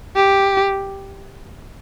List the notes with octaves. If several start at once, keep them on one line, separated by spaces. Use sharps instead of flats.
G4